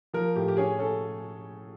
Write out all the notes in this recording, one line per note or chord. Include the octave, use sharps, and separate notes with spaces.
F3 A#4
A2 G4
G4
C#4 G#4
C#4 A4